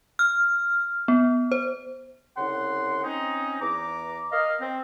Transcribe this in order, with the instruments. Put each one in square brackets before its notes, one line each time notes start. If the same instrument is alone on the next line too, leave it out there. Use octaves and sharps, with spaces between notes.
[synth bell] F6
B3
C5
[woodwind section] C2 C#3 D#4 F#5 C6
C4 C#4 D#4
E2 A#5 D6
A#4 D#5 F5
C4